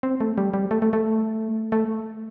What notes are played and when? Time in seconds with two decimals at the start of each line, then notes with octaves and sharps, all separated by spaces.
0.03 C4
0.20 A3
0.38 G3
0.54 G3
0.71 A3
0.82 A3
0.93 A3
1.72 A3